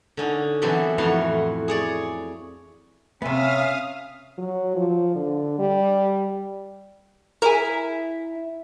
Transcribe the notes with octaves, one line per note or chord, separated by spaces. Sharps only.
D3 C#4 D#4
B2 E3 F#3 C4 G4 A4
F2 A2 E3 F#4 F5 C6
G#4 C#5 D5
C3 B3 C#4 E5 F5 D#6 F6
F#3
F3
D3
G3
E4 G#4 A#4